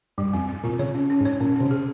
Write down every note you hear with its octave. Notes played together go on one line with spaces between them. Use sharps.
G2 G3
F2 C4
C4
A#2 F4
C#3 C#5
C#4
C#4
G#2
C#5
A#2 C#4
C3 C#4
G#4